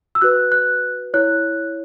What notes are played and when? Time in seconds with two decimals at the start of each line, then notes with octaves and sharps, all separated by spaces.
0.15 E6
0.22 F#4 B4 F#6
0.52 F#6
1.14 E4 C#5 F#6